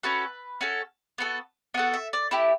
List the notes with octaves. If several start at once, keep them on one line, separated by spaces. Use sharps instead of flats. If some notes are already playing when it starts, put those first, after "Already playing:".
C#4 F#4 A4 B4
C#4 F#4 A4
B3 F#4 A4
B3 F#4 A4 F#5
E5
D5
A3 E4 G4